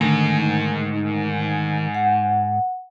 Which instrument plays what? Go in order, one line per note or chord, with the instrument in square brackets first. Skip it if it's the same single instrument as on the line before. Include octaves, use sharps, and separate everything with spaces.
[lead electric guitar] G#2 [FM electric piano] D3 A3 [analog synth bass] D#3
[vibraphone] F#5